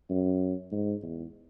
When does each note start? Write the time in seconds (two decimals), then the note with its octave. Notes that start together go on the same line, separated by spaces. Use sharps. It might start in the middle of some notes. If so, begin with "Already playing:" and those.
0.10 F#2
0.72 G#2
1.03 E2